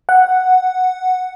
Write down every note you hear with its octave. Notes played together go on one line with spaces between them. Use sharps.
F#5